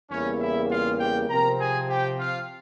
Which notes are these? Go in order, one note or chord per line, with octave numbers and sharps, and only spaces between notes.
E2 C#3 G3 A#3 C#4 E4 C#5
E4 E5
F4 F5
G4 G5
C3 F3 C4 A#4 A#5
G#4 G#5
G4 G5
F4 F5